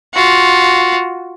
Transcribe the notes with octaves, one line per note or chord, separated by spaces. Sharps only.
F4 F#4